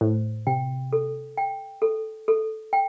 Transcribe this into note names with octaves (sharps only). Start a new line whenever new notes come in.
A2 C5
C3 G5
A4
G5
A4
A4
G5